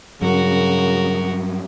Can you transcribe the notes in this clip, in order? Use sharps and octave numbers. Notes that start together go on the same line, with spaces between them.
G2 C#3 F#3 F#4 A#4